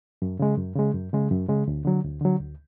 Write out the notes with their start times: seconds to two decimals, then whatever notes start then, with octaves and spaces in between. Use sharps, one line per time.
0.22 F#2
0.39 C#3 G#3
0.58 F#2
0.75 C#3 G#3
0.94 F#2
1.13 C#3 G#3
1.31 F#2
1.48 C#3 G#3
1.68 D2
1.85 D3 F#3
2.04 D2
2.21 D3 F#3
2.39 D2